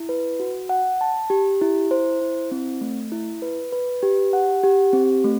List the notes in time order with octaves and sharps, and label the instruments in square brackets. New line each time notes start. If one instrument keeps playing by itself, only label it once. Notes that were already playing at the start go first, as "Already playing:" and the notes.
Already playing: [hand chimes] E4
B4
F#4
F#5
A5
G4
E4
C5
E4
C4
A3
E4
B4
B4
G4
F#5
G4
C4
A3